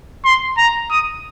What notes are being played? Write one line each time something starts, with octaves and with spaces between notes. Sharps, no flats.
C6
A#5
D#6